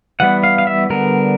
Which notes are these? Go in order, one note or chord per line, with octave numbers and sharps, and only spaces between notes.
E3 G3 B3 F#5
F5
F5
E5
D3 G3 B3 A#4